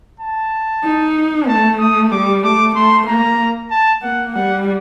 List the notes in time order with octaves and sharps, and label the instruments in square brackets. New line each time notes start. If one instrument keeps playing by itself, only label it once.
[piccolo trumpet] A5
[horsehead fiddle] D#4
[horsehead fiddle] A3 [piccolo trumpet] A5
[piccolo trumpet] D#6
[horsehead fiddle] G3 [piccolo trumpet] D6
[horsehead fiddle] A3 [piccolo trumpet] D6
[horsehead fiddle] A3 [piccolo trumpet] C6
[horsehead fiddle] A#3 [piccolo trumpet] A#5
[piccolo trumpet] A5
[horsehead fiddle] A#3 [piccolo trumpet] F#5
[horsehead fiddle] G3 [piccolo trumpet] F#5